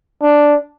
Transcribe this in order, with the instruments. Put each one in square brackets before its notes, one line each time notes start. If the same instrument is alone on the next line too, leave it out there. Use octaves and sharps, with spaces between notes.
[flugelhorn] D4